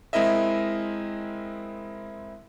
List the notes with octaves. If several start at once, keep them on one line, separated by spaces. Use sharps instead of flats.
G#3 C4 E4 A#4 D#5 E5